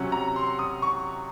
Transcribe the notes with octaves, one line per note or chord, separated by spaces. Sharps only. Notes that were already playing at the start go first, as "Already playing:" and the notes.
Already playing: C3 F#3 C#4 F#5
A#5
C6
D#6
C#6